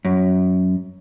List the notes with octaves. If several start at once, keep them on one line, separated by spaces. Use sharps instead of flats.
F#2